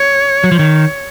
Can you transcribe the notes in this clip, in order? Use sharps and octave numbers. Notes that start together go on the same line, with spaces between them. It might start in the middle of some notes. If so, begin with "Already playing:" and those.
Already playing: C#5
F#3
F3
D#3 C#5